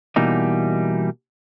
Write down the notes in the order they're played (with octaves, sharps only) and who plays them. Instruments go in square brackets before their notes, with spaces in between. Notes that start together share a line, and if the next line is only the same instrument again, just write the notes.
[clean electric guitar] B2 E3 G3 A#3 D#4